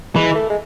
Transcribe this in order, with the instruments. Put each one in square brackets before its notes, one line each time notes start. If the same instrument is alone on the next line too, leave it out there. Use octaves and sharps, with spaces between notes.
[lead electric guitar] E3 [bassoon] G#3
[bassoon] A3
G#3